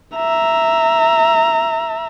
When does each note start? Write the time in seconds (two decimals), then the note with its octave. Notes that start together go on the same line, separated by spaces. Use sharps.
0.16 E5 A#5